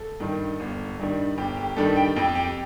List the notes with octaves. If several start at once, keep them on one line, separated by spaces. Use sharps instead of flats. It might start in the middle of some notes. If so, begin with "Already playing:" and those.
Already playing: A4
G2 D#3 G3 D4
G1
G2 D#3 G3 D4
G1 G4
G4
G2 D#3 G3 D4 A4
G4 G5
F2 G4 G5
G4 G5